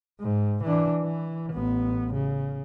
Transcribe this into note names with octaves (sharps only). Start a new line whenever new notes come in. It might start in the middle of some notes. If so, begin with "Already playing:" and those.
G#2
E3 D4
E3
A1 B3
C#3